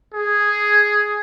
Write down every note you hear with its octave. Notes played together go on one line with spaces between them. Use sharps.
G#4